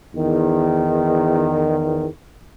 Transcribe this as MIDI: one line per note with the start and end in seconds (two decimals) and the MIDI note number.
0.15 2.05 40
0.15 2.05 51